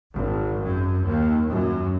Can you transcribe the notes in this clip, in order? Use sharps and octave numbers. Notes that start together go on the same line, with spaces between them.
G#1
F#2
D#2
F#2